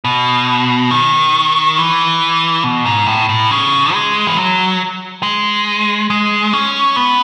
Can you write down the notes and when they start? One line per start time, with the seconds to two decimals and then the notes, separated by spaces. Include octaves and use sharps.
0.04 B2
0.91 D#3
1.78 E3
2.64 B2
2.86 G#2
3.07 A2
3.29 A2
3.51 C#3
3.94 G#3
4.27 E3
4.36 F#3
5.23 G#3
6.10 G#3
6.53 C#4
6.96 B3